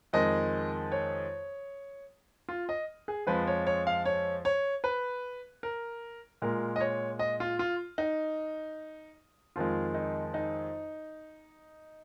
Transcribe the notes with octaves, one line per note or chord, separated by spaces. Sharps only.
F2 D#3 G#3 D#5
C#5
F4
D#5
G#4
F2 F3 G#3 B4
C#5
C#5
F5
C#5
C#5
B4
A#4
A#2 G#3 A#4
D#5
C#5
D#5
F4
F4
D#4
F2 D#3 G#3 F4
D#4
D#4